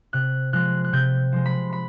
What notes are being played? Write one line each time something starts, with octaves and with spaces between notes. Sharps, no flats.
C3 F#6
F3 G#3 F#6
F#6
C3 G6
F3 G#3
B5
B5